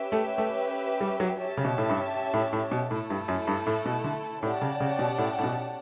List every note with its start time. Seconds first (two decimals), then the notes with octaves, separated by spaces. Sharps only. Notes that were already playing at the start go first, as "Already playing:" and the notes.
Already playing: C#4 G4 B4 E5
0.12 A3
0.38 A3
1.01 G3
1.20 F#3
1.39 C#4 G4 C#5 E5 A5
1.57 C#3
1.65 B2
1.78 A2
1.89 G2
2.33 A2
2.53 A2
2.71 B2
2.90 A2 A3 E4 A4
3.10 G2
3.28 F#2
3.47 G2
3.67 A2
3.85 B2
4.04 D3
4.43 A2 C#4 G4 D5 F#5 A5
4.62 C#3
4.80 C#3
4.99 B2
5.18 A2
5.38 A2
5.43 B2